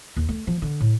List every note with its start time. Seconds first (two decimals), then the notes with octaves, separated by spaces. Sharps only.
0.16 D#2
0.29 A3
0.47 F3
0.62 D3
0.80 A2